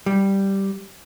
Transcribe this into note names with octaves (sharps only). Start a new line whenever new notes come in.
G3